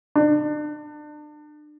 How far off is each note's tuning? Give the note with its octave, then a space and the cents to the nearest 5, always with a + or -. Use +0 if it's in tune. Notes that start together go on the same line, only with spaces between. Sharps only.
D4 +35